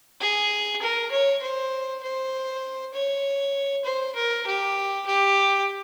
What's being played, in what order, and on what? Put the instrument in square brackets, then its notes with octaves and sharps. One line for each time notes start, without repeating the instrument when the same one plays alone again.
[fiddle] G#4
A#4
C#5
C5
C5
C#5
C5
A#4
G4
G4